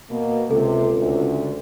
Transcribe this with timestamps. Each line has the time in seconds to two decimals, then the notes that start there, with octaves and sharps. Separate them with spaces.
0.11 B2 A#3
0.51 C#2 C3 A4
0.98 D2